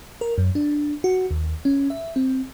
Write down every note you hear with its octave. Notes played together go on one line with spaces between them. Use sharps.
A#4
F#2
D4
F#4
D#2
C#4
E5
C4